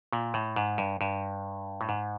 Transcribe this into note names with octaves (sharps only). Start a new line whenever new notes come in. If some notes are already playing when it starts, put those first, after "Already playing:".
A#2
A2
G#2
G2
G2
A2
G#2